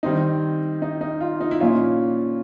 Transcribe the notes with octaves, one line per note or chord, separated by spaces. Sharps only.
D#3 G3 C4 D#4
D#4
D#4
F4
D#4
E4
A#2 F3 A#3 C#4 F4